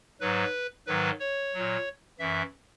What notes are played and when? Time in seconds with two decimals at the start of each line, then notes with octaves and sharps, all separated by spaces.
0.21 G#2 F#3 B4
0.87 G#2 D#3 F#3 B4
1.20 C#5
1.54 A#2 F#3
2.19 F#2 E3 E5